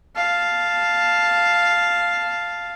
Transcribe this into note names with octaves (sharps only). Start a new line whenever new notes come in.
F5 A5